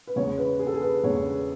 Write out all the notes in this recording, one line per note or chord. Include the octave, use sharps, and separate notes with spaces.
B4
E2 C#3 G#3 C#5
B4
G#4
A4
G#4
B4
E2 C#3 G#3 C#5